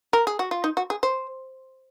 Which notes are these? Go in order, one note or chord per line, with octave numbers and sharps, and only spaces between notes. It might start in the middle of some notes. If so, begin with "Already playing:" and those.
A#4
G#4
F#4
F4
D#4
F#4
G#4
C5